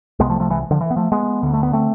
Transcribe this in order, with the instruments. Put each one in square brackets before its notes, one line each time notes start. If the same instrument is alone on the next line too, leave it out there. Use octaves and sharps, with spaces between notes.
[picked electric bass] C2 C3 G#3 B3
F3 A3
F3 A3
E3 G#3
D3 F3
E3
B3
F3 A3
G#3 B3
D2 D3
A3
B3
A3 C4